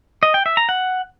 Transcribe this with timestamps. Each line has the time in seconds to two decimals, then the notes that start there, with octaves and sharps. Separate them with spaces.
0.23 D#5
0.34 G5
0.46 E5
0.57 A#5
0.69 F#5